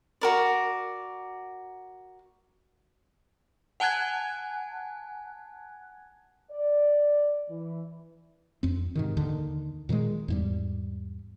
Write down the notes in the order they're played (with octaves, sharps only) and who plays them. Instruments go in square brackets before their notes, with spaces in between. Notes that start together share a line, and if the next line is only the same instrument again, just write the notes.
[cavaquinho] F#4 A#4 D5
[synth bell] F#5 G#5 A5 F#6 G#6
[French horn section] D5
E3
[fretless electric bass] F2 C4
G#2 C3 D#3
D#2 D3 D#3
A#2 D#3 F3 G#3
E2 G#2 G3